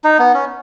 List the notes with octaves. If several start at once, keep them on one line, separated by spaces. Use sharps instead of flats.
D#4
B3
C#4